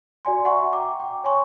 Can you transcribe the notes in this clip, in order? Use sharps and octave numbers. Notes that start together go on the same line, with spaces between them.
F#4 D5 G#5 C6
E5 F#5 G#5 A#5 C6 C#6
G5 A#5 D6
G5
C#5 G#5 C6 C#6